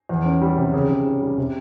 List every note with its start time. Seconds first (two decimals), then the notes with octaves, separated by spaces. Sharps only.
0.09 E2
0.25 C#4
0.42 G3
0.58 C3
0.73 C#3
0.89 C#3
1.06 C#4
1.22 G3
1.38 C3